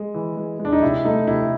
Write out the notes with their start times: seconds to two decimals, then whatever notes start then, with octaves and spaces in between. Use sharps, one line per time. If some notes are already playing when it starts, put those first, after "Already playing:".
Already playing: G#3
0.14 E3
0.37 G#3
0.59 G#3
0.65 D4
0.73 D#4
0.82 C3 E4
1.05 A3 D#4
1.27 C3 E4